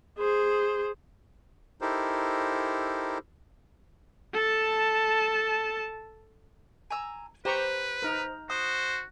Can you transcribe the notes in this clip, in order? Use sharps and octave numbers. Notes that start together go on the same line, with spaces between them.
G#4 C5
D#4 E4 G4 A4 A#4 C5
A4 A5
G#5 A#5 E6
G4 B4 C5 A#5 C#6
D#4 A#4
F#4 C5 D#6